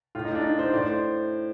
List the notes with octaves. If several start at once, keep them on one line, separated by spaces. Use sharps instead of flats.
A2 F4
D#4
D4
D#4
C5
A2 D5
C5